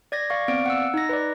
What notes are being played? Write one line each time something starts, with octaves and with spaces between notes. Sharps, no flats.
D5 G#6 A#6
D5 F5 C#6
B3 C4 D5 F5 D7
F#5 E6
D#4 A#6
B4 D5